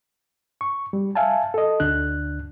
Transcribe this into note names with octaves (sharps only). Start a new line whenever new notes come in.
C#6
G3
E5 F5 G#5 A5
A4 D#5
D2 D3 D4 F#6